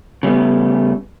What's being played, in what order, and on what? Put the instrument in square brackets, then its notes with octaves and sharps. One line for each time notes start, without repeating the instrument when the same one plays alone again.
[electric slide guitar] C#3 G3 A3 B3